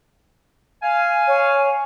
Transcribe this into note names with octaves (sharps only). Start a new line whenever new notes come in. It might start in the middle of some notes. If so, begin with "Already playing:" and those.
F5 G#5
C#5